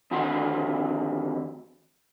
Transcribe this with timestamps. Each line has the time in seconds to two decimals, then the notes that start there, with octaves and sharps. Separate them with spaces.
0.11 F2 D3 D#3 F#4 F#5 C6